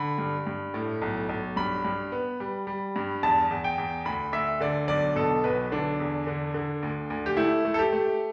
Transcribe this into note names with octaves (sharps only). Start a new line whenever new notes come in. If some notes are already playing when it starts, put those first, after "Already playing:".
Already playing: D3 B5
G2
G2
A2
B1
B1
G2 B5
G2
B3
G3
G3
G2
E2 A5
E2
G5
E2
D2 B5
D2 E5
D3 D5
B1 D5
B2 A4
B1 B4
D3 D4
E2
D3
D3
D2
D2
G4
A3 E4
A3
A4
G4
A3